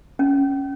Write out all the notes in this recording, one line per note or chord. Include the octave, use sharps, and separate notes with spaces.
C#4